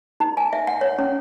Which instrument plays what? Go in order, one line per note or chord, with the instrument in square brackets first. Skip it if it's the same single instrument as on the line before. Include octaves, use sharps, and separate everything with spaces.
[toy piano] D#4
G#5
E5
F#5
C#5
C#4